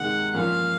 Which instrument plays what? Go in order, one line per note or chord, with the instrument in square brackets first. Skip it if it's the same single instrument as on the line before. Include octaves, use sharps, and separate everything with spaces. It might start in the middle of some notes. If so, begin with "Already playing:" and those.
Already playing: [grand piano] C3 D#3 G#3 D#4 [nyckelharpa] F#5
[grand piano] A#2 F3 A#3 C#4 F4 [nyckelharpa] F5